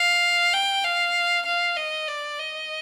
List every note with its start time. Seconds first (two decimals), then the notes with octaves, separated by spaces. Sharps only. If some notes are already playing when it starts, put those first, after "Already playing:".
Already playing: F5
0.53 G5
0.84 F5
1.45 F5
1.77 D#5
2.08 D5
2.39 D#5